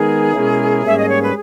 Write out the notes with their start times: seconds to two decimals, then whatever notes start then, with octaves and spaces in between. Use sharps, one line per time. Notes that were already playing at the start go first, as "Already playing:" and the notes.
Already playing: D#3 G#3 B3 D#4 G#4 A#4
0.33 B2 G#3 C#4 E4 A#4
0.82 G#2 G3 A#3 C#4 E5
0.97 D#5
1.09 C#5
1.20 B4